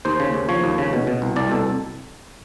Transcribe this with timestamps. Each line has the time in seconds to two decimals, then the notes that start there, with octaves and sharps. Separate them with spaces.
0.05 D#2 C5
0.20 C#3
0.34 D#2
0.49 F3 C#5
0.64 D#2
0.78 C#3
0.93 B2
1.07 B2
1.22 C2
1.36 C2 D5
1.51 B2 A4